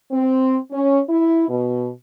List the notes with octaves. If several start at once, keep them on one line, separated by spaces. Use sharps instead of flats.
C4
C#4
E4
B2